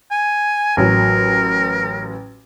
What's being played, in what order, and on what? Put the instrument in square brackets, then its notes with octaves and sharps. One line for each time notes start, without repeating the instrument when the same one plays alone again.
[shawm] G#5
[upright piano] A1 F#3 [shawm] A#4